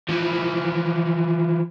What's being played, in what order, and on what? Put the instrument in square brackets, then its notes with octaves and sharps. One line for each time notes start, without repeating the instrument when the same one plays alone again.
[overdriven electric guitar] E3 F3